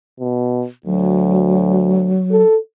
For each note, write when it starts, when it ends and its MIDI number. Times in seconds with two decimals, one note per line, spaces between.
0.20 0.66 47
0.86 2.22 38
0.86 2.43 54
2.31 2.57 69